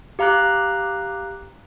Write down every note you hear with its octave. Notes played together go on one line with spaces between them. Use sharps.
G4 F5 A#5 D6 F#6